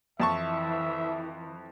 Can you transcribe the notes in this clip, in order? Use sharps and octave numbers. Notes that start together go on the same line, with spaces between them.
F2 E3 E5 A5 C#6